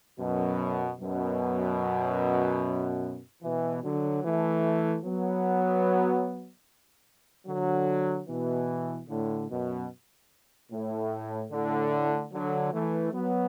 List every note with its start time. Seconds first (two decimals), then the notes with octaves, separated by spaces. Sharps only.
0.19 F#2 B2
1.01 F#2 B2
3.43 B2 E3
3.84 D3 F#3
4.24 E3 A3
5.05 F#3 B3
7.48 D3 F#3
8.28 B2 E3
9.09 A2 D3
9.49 F#2 B2
10.72 A2
11.52 A2 D3
12.33 D3 F#3
12.73 E3 A3
13.13 F#3 B3